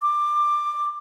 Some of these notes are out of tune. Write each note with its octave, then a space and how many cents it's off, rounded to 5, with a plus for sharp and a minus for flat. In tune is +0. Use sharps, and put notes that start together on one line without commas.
D6 +15